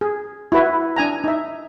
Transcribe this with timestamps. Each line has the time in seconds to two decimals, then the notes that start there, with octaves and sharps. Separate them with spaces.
0.01 G#4
0.52 E4 F#4 B4 E5
0.96 D4 G#5 A#5
1.24 D#4 E5